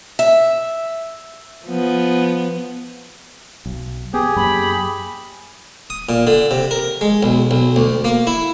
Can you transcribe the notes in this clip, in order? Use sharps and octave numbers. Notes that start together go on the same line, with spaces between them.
E5
F3 B3
B1
B3 G4 G#4
F#2 F#3 A#3 B5
D#6
A#2
D3
C3
A#4
G#3
B1
B1
D2
A#3
E4